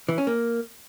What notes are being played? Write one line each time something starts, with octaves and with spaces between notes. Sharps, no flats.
E3
C#4
A#3